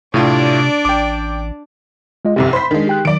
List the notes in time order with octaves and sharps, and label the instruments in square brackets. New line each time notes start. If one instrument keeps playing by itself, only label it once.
[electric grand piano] A2 A3 F4 [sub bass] C3 [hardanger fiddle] D4 D5
[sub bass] A1 [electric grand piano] G5 D6
[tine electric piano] G#3 F4 D#5
[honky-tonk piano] F1 C2 C3 [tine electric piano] G4
[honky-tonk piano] C5 B6 [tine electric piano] B5
[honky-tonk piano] D#3 G#3 [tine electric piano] D4
[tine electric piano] G4 G5 F#6
[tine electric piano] D#3 F#3 [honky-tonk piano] D5 D7